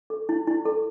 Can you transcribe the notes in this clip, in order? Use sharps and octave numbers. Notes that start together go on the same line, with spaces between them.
A4
E4
E4
A4